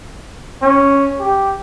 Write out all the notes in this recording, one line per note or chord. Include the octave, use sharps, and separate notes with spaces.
C#4
G4